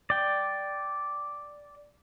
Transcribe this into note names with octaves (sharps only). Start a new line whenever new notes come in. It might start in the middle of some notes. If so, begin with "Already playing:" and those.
D5 G5